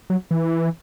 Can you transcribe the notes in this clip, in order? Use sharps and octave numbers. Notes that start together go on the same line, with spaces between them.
F#3
E3